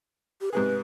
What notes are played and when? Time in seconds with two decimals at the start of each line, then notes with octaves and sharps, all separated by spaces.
0.41 G4
0.53 G#2 C3 G#4 B4